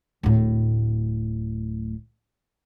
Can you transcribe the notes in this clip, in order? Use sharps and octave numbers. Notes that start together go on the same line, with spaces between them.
D1 A2